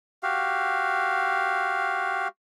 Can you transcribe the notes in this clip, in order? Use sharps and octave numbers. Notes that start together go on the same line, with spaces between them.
F#4 G4 F5